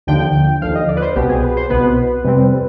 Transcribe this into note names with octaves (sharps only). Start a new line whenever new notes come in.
D#2 D3 F3 G5
D#2 D3 F3 F5
D#5
D5
B4
C5
C2 B2 B3 G4
G#4
B4
C5
C2 B2 B3 B4
F2 C3 G3 C4